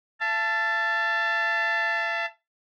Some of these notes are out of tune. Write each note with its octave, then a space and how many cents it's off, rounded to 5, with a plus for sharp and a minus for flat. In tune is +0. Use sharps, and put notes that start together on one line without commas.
E5 +45 A5 +0